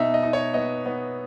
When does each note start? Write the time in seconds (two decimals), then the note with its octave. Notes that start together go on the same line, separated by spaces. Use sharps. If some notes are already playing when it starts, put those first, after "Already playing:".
Already playing: B2 D#4 E5
0.14 D#5
0.23 D#4
0.33 C#5
0.54 B3 D#5
0.86 B3